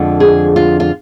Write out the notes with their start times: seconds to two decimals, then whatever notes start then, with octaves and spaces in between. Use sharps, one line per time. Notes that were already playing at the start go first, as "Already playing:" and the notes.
Already playing: F2 D3 F3 G#3
0.20 G#4
0.56 F4
0.80 F4